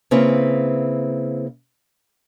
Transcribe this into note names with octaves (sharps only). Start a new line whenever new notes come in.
C#3 A#3 C4 E4 B4